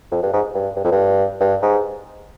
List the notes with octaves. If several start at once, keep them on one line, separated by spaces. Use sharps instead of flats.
F2
G2
G#2
G2
G2
F2
G2
G2
G#2